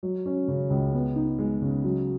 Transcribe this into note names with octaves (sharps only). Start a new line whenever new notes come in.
F#3
C#4
C#3
C#2
B3
D#4
G#3
C#3
F#3